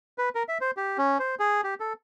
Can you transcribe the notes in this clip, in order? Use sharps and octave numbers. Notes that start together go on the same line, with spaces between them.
B4
A#4
E5
C5
G4
C#4
C5
G#4
G4
A4